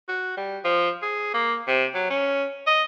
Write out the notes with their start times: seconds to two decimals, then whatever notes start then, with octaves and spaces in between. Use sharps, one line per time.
0.08 F#4
0.37 G3
0.64 F3
1.02 G#4
1.34 A#3
1.68 C3
1.94 F#3
2.10 C#4
2.67 D#5